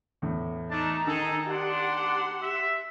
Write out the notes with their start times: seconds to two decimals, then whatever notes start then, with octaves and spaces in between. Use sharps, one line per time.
0.22 E2 A2
0.71 A3 D4 D#4 A5 A#5
1.07 D#3 G#4 A4
1.49 D4 G4 F#5 C6
2.42 E5